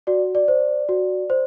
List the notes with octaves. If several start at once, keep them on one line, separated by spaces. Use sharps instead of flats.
F#4 D5
D5
C5
F#4
C5